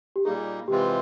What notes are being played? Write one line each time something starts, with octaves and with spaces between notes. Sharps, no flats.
G4
A#2 G3 A#3 D#4 G#4
C3 E3 G#3 C4 F4 G4